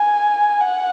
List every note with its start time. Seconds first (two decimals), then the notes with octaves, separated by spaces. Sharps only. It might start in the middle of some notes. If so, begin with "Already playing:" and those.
Already playing: G#5
0.61 F#5